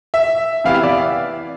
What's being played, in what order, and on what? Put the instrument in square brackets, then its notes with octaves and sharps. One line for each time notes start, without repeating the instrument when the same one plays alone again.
[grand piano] E5
[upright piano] C3 E3 B3 E4 G4 [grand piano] F5
[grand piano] E5
D5